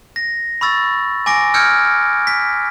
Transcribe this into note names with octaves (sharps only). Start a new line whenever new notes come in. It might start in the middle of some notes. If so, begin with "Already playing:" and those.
A#6
B5 C#6 E6 A6
G#5 D6 A#6 D7
E6 F6 G6 G#6 C#7 D7
B6